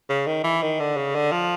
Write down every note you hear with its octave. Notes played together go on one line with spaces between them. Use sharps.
C#3
D#3
E3
D#3
D3
C#3
D3
F3